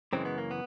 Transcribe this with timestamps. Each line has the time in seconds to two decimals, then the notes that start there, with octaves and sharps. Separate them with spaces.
0.13 F#2 C#3 E3 G#3 C4
0.25 B3
0.38 A#3
0.51 B3